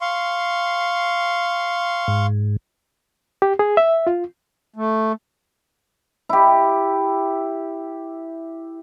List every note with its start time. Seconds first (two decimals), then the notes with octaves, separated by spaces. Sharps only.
0.01 F5 C6 C#6
2.08 G#2
3.42 G4
3.59 G#4
3.77 E5
4.07 F4
4.76 A3
6.29 E4 G4